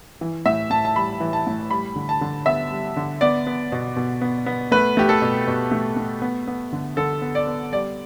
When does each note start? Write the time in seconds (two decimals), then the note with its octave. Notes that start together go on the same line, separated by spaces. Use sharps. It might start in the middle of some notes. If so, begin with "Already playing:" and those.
0.21 E3
0.46 A2 E5
0.70 A2 A5
0.85 A5
0.96 G3 B5
1.20 E3
1.33 A5
1.47 A2
1.71 G3 B5
1.96 D3
2.09 A5
2.21 D3
2.46 B3 E5
2.71 G3
2.96 D3
3.21 B3 D5
3.47 B3
3.72 B2
3.96 B2
4.21 B3
4.46 B3
4.72 A3 B4
4.97 A3 G4
5.09 A4
5.22 B2
5.47 B2
5.71 A3
5.97 A3
6.22 B3
6.47 B3
6.73 D3
6.97 D3 A4
7.22 B3
7.35 D5
7.47 B3
7.73 G3 D5